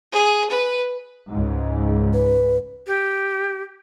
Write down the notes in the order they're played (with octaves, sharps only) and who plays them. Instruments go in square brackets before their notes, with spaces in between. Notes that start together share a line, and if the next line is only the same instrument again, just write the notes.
[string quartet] G#4
B4
[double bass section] C#2 G#2
[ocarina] B4
[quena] G4